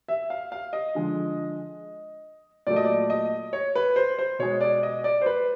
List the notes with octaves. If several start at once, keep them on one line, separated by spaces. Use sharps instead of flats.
E5
F5
F5
D#5
D3 F3 G#3
A#2 F#3 A3 D5
D#5
D5
D#5
C#5
B4
C5
C5
B2 G#3 C#5
D5
D#5
D5
C5
B4